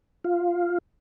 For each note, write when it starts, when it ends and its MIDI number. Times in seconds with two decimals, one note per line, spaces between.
0.24 0.78 65